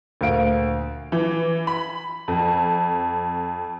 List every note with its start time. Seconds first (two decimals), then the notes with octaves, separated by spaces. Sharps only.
0.21 D2 A#2 F5 D7
1.12 E3
1.67 B5
2.28 F2